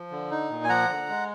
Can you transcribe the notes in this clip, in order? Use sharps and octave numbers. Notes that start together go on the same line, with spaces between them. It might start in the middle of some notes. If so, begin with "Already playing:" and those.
Already playing: F3
D3
D#4
A#2
G#5
F3 F#5 A#5
D3
G#3